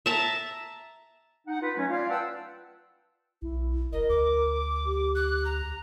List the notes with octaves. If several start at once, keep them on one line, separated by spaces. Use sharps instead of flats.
E5 A5 A#5
D#4 F#5
D#4 F4 B4
F#3 A3 C#4
F4 D5 F5
B4 F#5 G5 A5 E6
B1 E4
F#1 A#4 D#5
D2 D6
G4
F#6
A#5